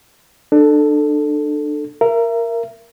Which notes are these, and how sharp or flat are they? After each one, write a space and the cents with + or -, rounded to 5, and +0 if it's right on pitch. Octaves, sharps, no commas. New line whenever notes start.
D4 +30 A4 +0
A#4 +0 E5 +35